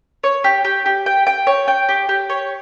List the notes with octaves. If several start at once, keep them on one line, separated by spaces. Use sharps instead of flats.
C#5
G4
G4
G4
G5
G5
C#5
G5
G4
G4
C#5